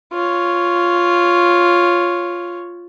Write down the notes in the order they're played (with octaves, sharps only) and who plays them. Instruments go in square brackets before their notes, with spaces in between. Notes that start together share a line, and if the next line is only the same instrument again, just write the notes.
[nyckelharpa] F4 C#5